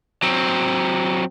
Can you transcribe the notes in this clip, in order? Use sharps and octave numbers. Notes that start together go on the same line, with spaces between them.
F#3 C4